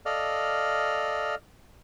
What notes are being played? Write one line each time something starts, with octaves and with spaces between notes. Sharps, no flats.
A4 D5 D#5 F5 F6